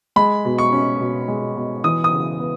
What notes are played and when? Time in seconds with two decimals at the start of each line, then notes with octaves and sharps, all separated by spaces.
0.16 G#3 B5
0.45 B2
0.58 C#6
0.72 C#4
1.00 B2
1.28 G#3
1.56 B2
1.84 E3 D#6
2.04 D#6
2.12 C#3
2.40 B3